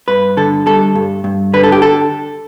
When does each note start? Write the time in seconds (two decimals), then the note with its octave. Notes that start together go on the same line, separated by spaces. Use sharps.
0.08 G2 B4
0.37 D3 A4
0.66 G3 A4
0.95 G2
1.24 G2
1.53 D3 B4
1.63 A4
1.72 G4
1.82 A4